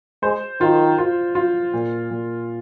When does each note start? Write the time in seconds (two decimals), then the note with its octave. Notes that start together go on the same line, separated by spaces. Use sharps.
0.23 G#3 C5
0.61 D#3 F4
0.98 F4
1.35 F4
1.73 A#2
2.11 A#2